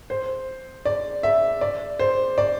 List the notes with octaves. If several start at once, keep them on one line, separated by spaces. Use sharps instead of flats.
C5
D5
E5
D5
C5
D5